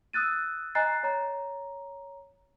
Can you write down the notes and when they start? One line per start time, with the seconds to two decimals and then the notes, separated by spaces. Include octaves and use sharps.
0.13 D#6 E6 F#6 A6 D#7
0.75 D#5 G#5 A#5 F#6 A6 C7
1.03 C#5 A#5